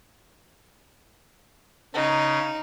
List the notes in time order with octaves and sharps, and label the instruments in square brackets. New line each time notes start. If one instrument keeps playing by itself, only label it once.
[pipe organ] C#3 [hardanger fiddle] D#4